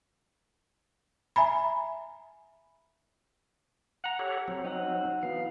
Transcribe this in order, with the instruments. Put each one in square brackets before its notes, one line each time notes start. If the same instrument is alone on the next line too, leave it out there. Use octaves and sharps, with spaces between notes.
[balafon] E5 G#5 A#5 B5
[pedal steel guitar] F#5 A#5
[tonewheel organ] G4 A4 C#5
F#3 C4
[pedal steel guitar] D#4 F#4
[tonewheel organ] E3 B3 [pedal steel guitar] F5